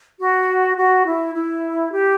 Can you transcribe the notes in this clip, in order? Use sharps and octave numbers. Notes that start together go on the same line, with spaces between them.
F#4
F#4
E4
E4
G4